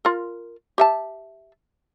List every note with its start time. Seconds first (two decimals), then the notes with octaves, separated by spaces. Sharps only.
0.05 F4 A#4
0.78 G4 E5 A5